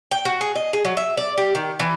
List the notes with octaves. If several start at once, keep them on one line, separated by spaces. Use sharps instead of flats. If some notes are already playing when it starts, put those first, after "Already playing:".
G5
F#4
G#4
D#5
G#4
F#3
E5
D5
G4
D#3
E3